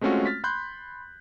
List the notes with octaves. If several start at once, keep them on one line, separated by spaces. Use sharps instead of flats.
G#3 A3 C4 C#4 F4 F#4
F6 A6 B6
B5 C6 F#6 G6